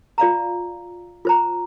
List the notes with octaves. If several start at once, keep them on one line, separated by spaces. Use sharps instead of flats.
F4 D5 F5 A#5
F4 C5 A#5